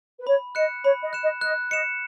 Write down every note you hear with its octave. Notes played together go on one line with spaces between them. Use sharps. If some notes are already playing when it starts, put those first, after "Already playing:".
B4
C#5 B5
D#5 F#6 C#7 E7
C#5 B5
D#5
F#6 C#7 E7
D#5
D#5 F#6
D#5 C#7 E7